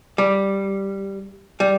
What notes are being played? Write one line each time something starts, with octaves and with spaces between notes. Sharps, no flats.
G3
G3